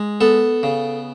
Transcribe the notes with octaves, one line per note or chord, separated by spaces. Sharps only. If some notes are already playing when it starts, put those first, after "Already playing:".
Already playing: G#3
B3 A4
C#3